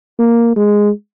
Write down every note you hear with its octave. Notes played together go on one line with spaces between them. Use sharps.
A#3
G#3